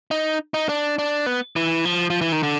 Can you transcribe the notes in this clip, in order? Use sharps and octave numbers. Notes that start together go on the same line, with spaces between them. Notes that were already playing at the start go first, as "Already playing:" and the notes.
D#4
D#4
D4
D4
B3
E3
F3
F3
E3
D#3
D3